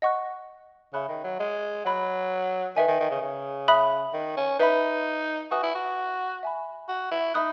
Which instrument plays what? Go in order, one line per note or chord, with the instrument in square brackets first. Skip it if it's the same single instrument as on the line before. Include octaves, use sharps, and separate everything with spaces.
[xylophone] D#5 F#5 C#6 F#6
[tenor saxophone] C#3 [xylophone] E5 B5 F#6
[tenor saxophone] D#3
F#3
G#3
[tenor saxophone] F#3 [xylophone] F#5 B5 F#6
[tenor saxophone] D#3 [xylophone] B4 E5 G#5
[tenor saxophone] D#3
D#3
C#3
C#3
[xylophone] E5 B5 D#6 F#6
[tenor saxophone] D#3
C#4
[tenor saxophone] D#4 [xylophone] B4 E5 B5
[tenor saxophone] F#4 [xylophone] B4 E5 G#5 D#6 F#6
[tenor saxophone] E4
F#4
[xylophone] E5 G#5 B5
[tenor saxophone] F#4
E4
[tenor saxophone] D#4 [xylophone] E5 B5 D#6 F#6